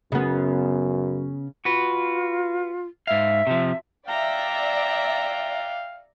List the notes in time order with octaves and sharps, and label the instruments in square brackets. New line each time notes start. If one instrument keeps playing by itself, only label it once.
[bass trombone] F#2 [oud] C#3 B3
[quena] F4 [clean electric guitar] F#4 B4
[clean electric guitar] G#2 F5 [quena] E5
[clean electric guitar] C3 F3
[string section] D5 E5 [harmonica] F5 G5 [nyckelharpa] A#5